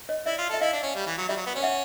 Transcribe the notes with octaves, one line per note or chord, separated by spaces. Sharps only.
C#5 D#5
E4 D5 E5
F4
A4 E5
E4 D#5 F5
D4
C#4
G3
E3
F#3
G3 D5 E5
F#3
B3
C#4
E5 F#5